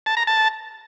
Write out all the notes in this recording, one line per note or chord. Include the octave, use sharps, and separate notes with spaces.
A5
A#5
A5